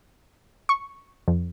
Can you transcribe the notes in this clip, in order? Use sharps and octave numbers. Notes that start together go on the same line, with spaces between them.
C#6
F2